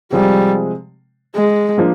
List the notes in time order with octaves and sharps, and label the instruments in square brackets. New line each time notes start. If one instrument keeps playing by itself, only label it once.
[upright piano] C3 F3 G#3 [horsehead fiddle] G3
[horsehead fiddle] G#3
[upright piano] F3 A#3 D4